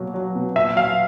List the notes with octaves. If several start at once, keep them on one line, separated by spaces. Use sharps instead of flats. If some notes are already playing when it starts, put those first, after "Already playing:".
Already playing: B2 F#3 A#3
F#3
B2
A#2 E5
F#3 F5